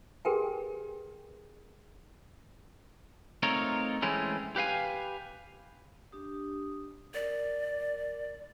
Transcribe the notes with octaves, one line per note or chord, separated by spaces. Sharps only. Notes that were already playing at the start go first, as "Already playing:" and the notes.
G4 G#4 A#4 B4 G5 G#5
A3 C4 D#4 F4 A#4 C#5
E3 G#3 A3 C4 C#4 E4
G4 B4 F5 G#5
D4 G4 D#6
A#4 D5